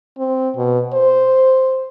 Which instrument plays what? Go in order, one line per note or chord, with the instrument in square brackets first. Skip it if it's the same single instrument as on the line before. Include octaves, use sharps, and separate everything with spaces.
[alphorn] C4
B2
C5